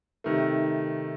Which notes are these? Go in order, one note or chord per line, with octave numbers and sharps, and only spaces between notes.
C3 D#3 A3